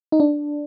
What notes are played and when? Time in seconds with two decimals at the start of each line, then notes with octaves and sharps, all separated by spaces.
0.12 D#4
0.20 D4